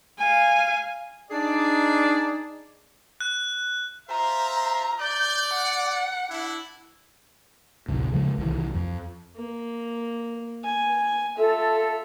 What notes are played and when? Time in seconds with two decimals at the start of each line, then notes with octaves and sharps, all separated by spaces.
0.18 F5 G#5
1.31 D4 D#4 G#4 D5
3.21 F#6
4.09 F4 C5 E5 A#5
5.00 D5 G6
5.54 F#5
6.30 D4 E4
7.88 A1 D2 C3
8.12 C#3 F3 F#3 G#3
8.38 C2 D#3 E3
8.74 F2
9.36 A#3
10.64 G#5
11.38 F4 A4 E5